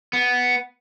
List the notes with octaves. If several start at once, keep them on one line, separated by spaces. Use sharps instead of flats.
B3